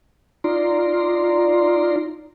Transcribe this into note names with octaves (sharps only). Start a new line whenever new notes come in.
D#4 F4 D5 A#5 C6